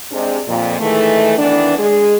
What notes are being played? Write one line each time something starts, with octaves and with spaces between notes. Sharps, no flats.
C3 G#3 D4
F2 A#2
D#3 E3 G#3 A3
D#3 E3 B3 D4
G#3 G#4